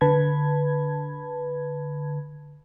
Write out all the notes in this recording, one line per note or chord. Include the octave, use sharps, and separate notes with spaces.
D3 B4 A5 B5 G#6